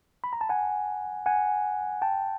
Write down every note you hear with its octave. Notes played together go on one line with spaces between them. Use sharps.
B5
A#5
A5
F#5 G#5
F#5 G#5
G5 A5